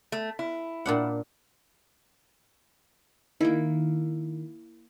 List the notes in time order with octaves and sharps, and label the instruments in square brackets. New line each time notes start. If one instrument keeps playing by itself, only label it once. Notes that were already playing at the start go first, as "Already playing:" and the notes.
[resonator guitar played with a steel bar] A3
E4
[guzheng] A#2 D4 F#5
[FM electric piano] D#3 [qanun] A#3 E4